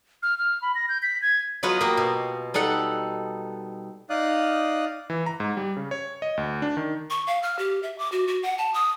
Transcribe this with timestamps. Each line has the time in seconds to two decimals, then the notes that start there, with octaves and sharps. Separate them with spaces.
0.23 F6
0.38 F6
0.62 B5
0.75 A#6
0.89 G6
1.03 B6
1.22 G#6
1.63 F#3 B3 F4 F#4 B4 D#5
1.81 A#3 G4
1.97 B2
2.54 G3 D#4 A4 F#5
4.10 D#4 D5 F5 D#6 F#6
5.10 E3
5.26 A#5
5.40 G#2
5.57 G3
5.77 C#3
5.91 C#5
6.22 D#5
6.37 D2
6.62 D4
6.77 D#3
7.10 C#6
7.27 F5
7.43 F6
7.59 G4
7.83 E5
7.98 D6
8.12 F#4
8.27 F#4
8.43 F#5
8.58 A5
8.74 D#6